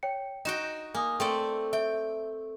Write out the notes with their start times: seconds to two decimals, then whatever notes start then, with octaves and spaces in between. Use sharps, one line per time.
0.03 C#5 G5 C#7
0.45 D#4 F#4 D#5 G5 E7
0.95 A#3 G#5 D#6
1.20 A3 C4 D5 G5
1.73 E5 G5